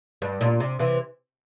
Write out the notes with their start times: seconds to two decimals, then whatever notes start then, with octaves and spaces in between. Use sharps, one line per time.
0.22 G2
0.41 A#2
0.60 C3
0.79 C3 E3